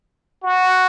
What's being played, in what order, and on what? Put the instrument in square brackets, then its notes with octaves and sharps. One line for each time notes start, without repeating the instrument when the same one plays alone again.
[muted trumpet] F#4